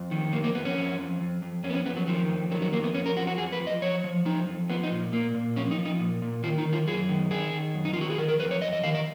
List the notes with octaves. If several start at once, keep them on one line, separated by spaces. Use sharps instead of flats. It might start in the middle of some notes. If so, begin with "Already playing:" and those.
Already playing: F2
D#3
F2 A#3
A#3
F2 B3
C#4
F2
F2
F2
F2
F2 C#4
B3
C#4
F2 B3
F#3
D#3 F3
F2
D#3 F#3
F#3
F2 A#3
B3
F2 C#4
A#4
F3 F#4
F#4
F2 G#4
B4
F3
D#5
F3 C#5
F3
F3 D#4
F2
F3 B3
D#4
A#2
A#2 A#3
A#2
F3 C#4
D#4
F3
D#4
A#2
A#2
D#3 F4
D#4
D#3
F4
F#2 G#4
D#3
D#3 G#4
D#3
F#2
D#4
F4
D#3 F#4
G#4
D#3 A#4
A#4
F2 B4
C#5
F2 D#5
D#5
D#3 F5
D#5